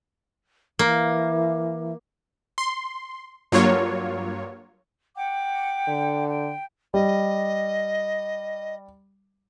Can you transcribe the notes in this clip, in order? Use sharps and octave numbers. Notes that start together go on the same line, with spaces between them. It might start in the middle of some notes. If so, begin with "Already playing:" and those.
E3 A#3
C6
G2 F#3 A#3 F4 C#5
F#5 G5 D6
D3
G5
G3 D#5